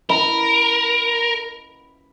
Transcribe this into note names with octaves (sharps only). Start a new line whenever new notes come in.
A#4 B5